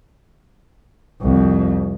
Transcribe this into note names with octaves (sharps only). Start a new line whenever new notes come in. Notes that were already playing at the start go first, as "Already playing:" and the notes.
C2 F2